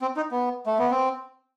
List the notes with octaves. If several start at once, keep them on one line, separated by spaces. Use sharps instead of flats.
C4
D#4
B3
A3
B3
C4